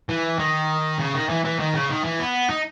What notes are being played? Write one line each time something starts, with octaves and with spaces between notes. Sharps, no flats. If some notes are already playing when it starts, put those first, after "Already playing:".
E3
D#3
C#3
D#3
E3
E3
D#3
C#3
D#3
E3
B3
D#4